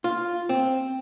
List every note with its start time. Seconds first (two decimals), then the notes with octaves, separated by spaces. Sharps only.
0.04 F4
0.49 C4